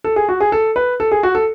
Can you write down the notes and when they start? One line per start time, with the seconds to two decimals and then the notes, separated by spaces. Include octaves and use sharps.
0.04 A4
0.16 G#4
0.29 F#4
0.40 G#4
0.52 A4
0.76 B4
1.00 A4
1.11 G#4
1.23 F#4
1.35 A4